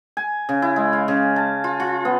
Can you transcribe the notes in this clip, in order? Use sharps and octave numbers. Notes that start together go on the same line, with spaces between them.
G#5
C#3
E4
G#3
F5
C#3
A5
F4
F4
B3